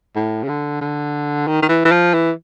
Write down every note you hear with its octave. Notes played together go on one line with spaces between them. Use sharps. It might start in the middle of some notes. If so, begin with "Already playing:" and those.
A2
C#3
D3
D3
D#3
D#3
E3
E3
F3
E3